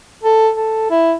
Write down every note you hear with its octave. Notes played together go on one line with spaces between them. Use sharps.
A4
A4
E4